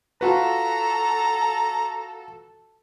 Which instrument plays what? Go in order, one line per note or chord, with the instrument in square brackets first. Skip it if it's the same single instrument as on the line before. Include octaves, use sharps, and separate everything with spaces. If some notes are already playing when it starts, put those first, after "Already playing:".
[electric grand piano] F4 F#4 B4 [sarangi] A4 [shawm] A#5